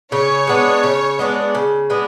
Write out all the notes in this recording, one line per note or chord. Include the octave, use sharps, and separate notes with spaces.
C#3 C#5
G#3 B3 D4
C#3
G#3 B3 D4
C#3
G#3 B3 D4